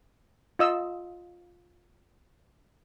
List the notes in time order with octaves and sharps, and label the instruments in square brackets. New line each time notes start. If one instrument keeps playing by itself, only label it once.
[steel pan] F4 D#5 E6